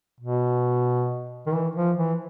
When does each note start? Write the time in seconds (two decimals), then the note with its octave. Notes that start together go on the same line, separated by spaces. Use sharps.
0.20 B2
1.47 D#3
1.53 E3
1.75 F3
1.97 E3